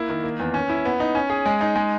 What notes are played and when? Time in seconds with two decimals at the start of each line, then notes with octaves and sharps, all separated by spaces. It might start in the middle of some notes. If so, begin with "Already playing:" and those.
Already playing: A#3 E4
0.09 D#3
0.23 A#3
0.40 E2
0.54 C#4
0.70 E4
0.85 B3
1.00 D#4
1.15 C#4
1.30 G#4
1.46 G#3
1.61 D#4
1.76 G#3